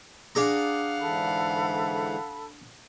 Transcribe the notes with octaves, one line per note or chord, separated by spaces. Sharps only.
D4 G#4 F5 F#5 A#5
G#2 D3 E3 A4 B5